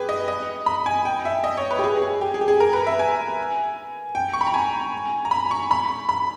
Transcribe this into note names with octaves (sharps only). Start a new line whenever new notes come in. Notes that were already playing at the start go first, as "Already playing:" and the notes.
Already playing: G4 G#4 B4
D#5
D#5
B5
G#5
G5
E5
D#5
C#5
B4
G4
G#4
G#4
G4
G#4
G4
G#4
A#4
B4
E5
G#5
G5
C#6
B5
A#5
G#5
A#5
B5
C#6
B5
B5